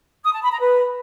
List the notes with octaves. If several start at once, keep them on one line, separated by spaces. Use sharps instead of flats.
D#6
A5
B5
A#5
B4